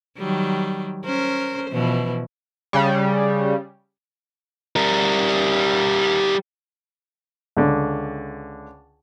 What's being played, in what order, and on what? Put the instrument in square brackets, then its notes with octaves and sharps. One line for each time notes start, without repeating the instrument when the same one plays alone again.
[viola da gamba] D#3 F#3 G3
C#4 A#4 C5
B2 E3 F3
[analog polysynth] C#3 G3
[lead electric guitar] G3 A#4
[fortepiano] C#2 D3